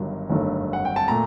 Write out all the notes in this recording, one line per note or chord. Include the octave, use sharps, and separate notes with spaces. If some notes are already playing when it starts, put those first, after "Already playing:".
Already playing: G1 G2 D#3 F#3
G1 G2 D#3 F#3 A3
F#5
G5
A5
A#2 A3 A#5